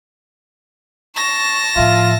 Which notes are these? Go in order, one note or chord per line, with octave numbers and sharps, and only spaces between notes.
A5 C#6 A#6
A2 F3 F4 E5